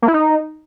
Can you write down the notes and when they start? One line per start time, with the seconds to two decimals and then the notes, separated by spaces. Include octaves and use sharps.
0.02 A#3
0.08 E4
0.14 D#4